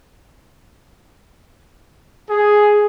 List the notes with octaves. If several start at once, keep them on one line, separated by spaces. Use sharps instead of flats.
G#4